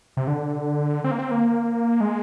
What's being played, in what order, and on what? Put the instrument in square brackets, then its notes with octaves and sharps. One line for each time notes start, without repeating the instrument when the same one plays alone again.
[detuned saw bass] C3
D3
C4
A#3
C4
A#3
G#3